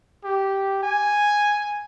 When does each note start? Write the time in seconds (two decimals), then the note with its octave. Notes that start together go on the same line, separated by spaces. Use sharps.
0.24 G4
0.83 G#5